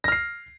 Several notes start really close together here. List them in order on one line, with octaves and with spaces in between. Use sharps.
A#6 F6 C7